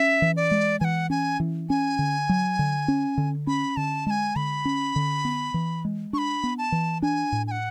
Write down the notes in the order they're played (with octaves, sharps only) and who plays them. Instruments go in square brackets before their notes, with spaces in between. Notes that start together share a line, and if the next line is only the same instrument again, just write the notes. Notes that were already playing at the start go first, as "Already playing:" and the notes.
Already playing: [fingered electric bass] C#4 [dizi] E5
[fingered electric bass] E3
[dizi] D5
[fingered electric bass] G#3
[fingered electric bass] E3 [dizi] F#5 G#5
[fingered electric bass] C#4 [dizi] G#5
[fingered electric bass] E3
[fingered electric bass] C#4 [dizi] G#5
[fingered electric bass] D3
F#3
D3
C#4
D3
[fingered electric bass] C#4 [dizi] B5
[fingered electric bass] D3 [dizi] A5
[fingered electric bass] G#3 [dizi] A5
[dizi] G#5
[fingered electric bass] D3 [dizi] B5
[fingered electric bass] C#4
D3
B3
E3
G#3
[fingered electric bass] D4 [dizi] C#6
[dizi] B5
[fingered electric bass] B3
[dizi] A5
[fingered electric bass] E3
[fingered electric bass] D4 [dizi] G#5
[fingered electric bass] A2
[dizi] G#5
F#5